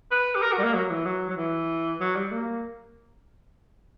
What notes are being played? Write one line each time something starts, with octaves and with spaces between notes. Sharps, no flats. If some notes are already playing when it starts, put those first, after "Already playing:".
B4
G4
A#4
F#4
G3
A#3
F#3
E3
F#3
F#3
E3
F#3
G3
A#3